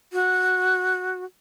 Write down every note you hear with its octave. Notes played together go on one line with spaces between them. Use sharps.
F#4